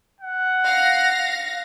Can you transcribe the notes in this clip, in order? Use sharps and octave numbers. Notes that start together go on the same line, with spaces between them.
F#5
F5 A#6